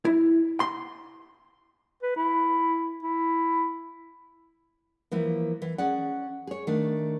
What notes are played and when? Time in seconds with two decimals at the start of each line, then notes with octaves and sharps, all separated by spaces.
0.05 E4
0.60 C6
2.03 B4
2.16 E4
3.03 E4
5.12 E3 F3 A#3 E4
5.62 E3
5.78 C#4 G#4 D5 F#5
6.47 G#4 C#5
6.67 D#3 A3 D4